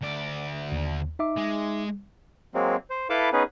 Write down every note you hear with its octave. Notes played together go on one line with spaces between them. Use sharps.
D2 D5
D#2
D#4 E5 D6
G#3
F#3 G#3 A#3 C4
C5
E4 A4 B4 F5 A5 D6
B3 C#4 D#4 G#4 B4